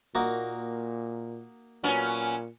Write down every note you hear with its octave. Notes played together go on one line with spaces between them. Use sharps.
A#2 A#3 D#4 F#4
A#2 F#3 B3 C#4